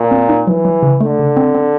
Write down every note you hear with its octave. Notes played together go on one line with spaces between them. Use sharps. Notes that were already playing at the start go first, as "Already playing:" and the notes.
Already playing: A#2
C4
D#4
E3 F#3
F#3
C#3
D3 A3
C#3
C4
C4